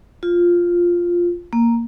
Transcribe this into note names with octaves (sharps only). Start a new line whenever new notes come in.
F4
A#3